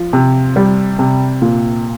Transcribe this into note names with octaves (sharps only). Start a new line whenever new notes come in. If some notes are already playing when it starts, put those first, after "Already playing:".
Already playing: F3
C3
G3
C3
A#2